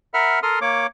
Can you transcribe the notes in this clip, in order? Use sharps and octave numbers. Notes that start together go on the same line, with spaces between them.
A#4 E5 F#5 B5 F6
A4 A#4 C6 D#6 F6
A#3 C#5 D6